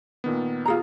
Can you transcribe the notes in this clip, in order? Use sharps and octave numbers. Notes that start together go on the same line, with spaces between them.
A#2 D#3 B3
F4 G#4 A#5